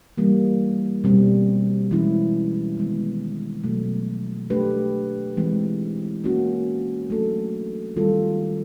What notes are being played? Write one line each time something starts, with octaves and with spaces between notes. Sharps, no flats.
E3 G3 A#3
B2 G3 C4
E3 G#3 C#4 E4
D#3 G#3 B3
B2 F#3 A3
A3 D4 G4 B4
E3 G#3 C4
A#3 C#4 F#4
F#3 A3 D4 F#4 A4
D#3 G3 C4 F4 A4